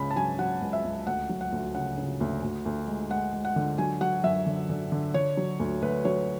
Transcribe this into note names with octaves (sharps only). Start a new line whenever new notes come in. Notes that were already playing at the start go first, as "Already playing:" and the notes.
Already playing: C#2 C#3 B5
A5
F#3 G#5
F#3 F#5
C#2
E5
C#2
D2 F#5
F#3
F#5
D2
C#3 F#5
C#3
D2
D2
D2
G#3
G#3 F#5
G#3
F#5
D3
F#3 G#5
F#3 F#5
F#2 E5
D3
D3
D3
D3 C#5
F#3
D2
D2 B4
F#3 C#5